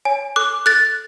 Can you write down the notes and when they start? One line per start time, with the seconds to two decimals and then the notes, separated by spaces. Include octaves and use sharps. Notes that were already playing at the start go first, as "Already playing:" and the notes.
0.05 C#5 G#5
0.36 A4 D6 F#6
0.66 A4 F#6 A6